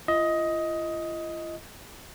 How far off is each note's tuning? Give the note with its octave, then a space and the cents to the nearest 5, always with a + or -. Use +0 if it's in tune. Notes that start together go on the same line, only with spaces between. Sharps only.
F4 -40 D#5 +15